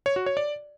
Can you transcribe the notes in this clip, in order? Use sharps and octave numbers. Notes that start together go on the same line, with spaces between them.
C#5
F#4
C#5
D5